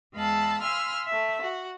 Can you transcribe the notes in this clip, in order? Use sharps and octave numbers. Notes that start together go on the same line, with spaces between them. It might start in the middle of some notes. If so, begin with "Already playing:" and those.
E2 G#3 F5 A5 B5 E6
F5 G#5 B5 C6 E6 F6
A3 E5
F#4